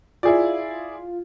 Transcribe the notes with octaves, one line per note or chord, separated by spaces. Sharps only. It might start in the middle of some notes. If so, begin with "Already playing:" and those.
E4 F4 G#4 D5